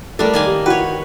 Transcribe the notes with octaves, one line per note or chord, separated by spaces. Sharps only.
G3 A3 D4 A#4
D#3 A#3 G#5
G4
E4 F#4 B4 C#5 G5